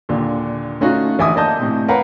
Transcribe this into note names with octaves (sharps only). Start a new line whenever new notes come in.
D#2 A#2 D3
A3 C#4 D#4 F4 F#4
A1 D3 E5 G#5 D6 D#6
A#3 D5 D#5 A5 G6
A2 C3
A#4 B4 C#5 F5 F#5 A#5